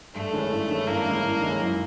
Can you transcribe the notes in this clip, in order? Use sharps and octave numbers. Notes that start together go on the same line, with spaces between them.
G2 A3
D#3 G#3 C#4 E4
G2
D#3 G#3 C#4 E4
G2 A#3
D#3 G#3 C#4 E4
G2
D#3 G#3 C#4 E4
F#2